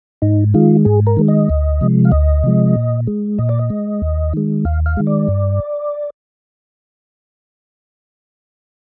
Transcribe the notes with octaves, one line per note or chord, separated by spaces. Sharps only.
G#2 D#4
D#3 G#3 F4
G#2 G#4
A#4
D#3 G#3
D#5
D2
C3 F3 G#3
F5
D2 D#5
C3 F3 G#3
A#2
G#3
A#2 D#5
D5
D#5
G#3
D#2
D#3 G#3
D#2 F5
F5
D#3 G#3
D5
G2